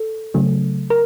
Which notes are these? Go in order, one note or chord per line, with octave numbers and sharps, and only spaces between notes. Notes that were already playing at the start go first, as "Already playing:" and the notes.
Already playing: A4
C#3 F#3 A3
A#4